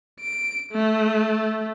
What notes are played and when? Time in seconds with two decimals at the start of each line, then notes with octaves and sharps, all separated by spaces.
0.21 D7
0.72 A3